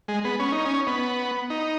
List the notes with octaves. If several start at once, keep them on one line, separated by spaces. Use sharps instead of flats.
G#3
B3
C#4
D#4
C#4
B3
D#4